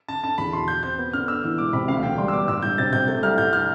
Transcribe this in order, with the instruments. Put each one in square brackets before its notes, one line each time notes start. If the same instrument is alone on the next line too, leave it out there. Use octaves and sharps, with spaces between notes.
[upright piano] D3 [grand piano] A5
[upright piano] D3 [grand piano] A5
[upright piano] E2 [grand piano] B5
[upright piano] B2 [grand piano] C6
[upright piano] B2 [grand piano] G6
[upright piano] C4 [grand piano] G6
[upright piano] B3
[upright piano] D3 [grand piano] F6
[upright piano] B3 [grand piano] E6
[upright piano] E3
[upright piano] E1 [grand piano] D6
[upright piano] C3 [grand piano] B5
[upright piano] D2 [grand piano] F5
[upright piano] E1 [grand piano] G5
[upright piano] G3 [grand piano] C6
[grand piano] E6
[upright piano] B3 [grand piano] D6
[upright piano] G1 [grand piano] E6
[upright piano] G1 [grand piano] G6
[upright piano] C3 [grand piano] A6
[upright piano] C3 [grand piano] G6
[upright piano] A3 [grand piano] G6
[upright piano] C2 [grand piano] F6
[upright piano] G1 [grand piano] G6
[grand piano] F6